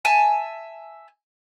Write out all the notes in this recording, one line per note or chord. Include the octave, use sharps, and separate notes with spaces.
E5 G#5 A5